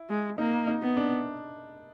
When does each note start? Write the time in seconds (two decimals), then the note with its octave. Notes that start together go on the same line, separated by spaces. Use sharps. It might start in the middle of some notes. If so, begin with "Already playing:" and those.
Already playing: E4
0.09 G#3
0.38 A#3 D#4
0.67 D#4
0.82 B3
0.97 D4